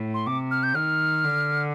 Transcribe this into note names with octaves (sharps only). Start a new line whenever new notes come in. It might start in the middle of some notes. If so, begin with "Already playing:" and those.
Already playing: A2
C6
C3 D6
F6
G6
D#3 F6
D3